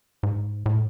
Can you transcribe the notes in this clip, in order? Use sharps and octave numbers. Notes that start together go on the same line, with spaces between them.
G#2
A2